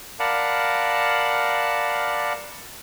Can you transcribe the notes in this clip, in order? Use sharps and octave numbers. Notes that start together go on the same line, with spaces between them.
A#4 D5 F5 F#5 A5 B5